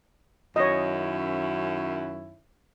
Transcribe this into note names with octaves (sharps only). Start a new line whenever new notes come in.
F#2 D#3 C#4 E4 C#5 D#5